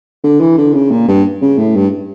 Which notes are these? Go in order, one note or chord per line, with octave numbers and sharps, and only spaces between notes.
D3
E3
D3
C#3
A#2
G2
C#3
A2
G2